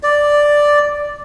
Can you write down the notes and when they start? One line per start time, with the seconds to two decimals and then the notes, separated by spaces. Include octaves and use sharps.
0.03 D5